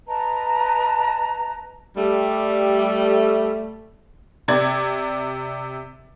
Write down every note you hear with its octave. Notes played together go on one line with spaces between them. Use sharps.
B4 D#5 A5 A#5
G3 A3
C3 D5 G#6